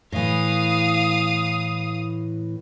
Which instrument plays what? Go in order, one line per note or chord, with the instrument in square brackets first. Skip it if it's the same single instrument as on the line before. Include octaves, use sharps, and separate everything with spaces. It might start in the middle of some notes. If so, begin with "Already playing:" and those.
[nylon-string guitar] A2 E3 [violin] F5 D#6